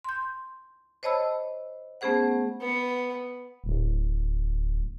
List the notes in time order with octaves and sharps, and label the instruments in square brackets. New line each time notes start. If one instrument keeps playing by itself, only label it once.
[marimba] C6 G6
C5 C#5 D#5 A5 B5 E6
A3 B3 C#4 G#4 C5 F#5
[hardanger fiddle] B3
[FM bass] D1